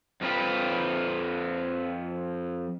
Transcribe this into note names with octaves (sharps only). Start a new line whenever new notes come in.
F2 F4 B4 G5